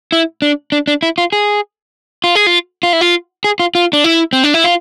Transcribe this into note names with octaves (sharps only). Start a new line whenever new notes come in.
E4
D4
D4
D4
E4
F4
G#4
F4
G#4
F4
F4
E4
F4
G#4
F4
F4
D4
E4
C4
D4
E4
F4